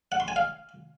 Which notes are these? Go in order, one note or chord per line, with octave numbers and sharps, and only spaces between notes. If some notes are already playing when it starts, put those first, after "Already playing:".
F#5
C6
G#5
F5